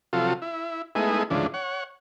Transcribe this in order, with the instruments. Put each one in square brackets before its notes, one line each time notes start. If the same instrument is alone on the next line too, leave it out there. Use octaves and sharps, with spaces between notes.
[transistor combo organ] C3 F3 F#3 F4 A4
E4
G#3 A3 B3 D#4 E4 G#4
D2 G#2 C#3 E3 F3 D4
C#5 F#5